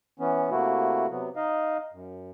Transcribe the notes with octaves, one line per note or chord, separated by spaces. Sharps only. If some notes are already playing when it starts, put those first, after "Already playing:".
E3 B3 C#4
C3 A3 A#3 E4 F#4
C3 F#3 B3
D#4 D#5 F5
F#2